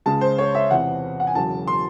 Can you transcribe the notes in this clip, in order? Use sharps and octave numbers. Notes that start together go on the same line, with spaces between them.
C#2 C#3 G#3 A5
C5
C#5
E5
E2 C3 E3 F#5
F#5
G#5
E1 E2 C#3 F#3 A5
C6